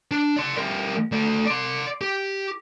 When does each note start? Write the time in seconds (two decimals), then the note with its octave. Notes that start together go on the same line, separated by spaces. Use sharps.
0.11 D4
0.36 D5 C6
0.57 G3 A#4
1.12 A3 D5
1.47 D5 C6
2.01 G4